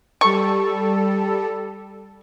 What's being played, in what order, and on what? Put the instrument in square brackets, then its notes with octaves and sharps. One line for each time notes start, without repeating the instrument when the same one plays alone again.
[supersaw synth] G3 A4 [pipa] C#6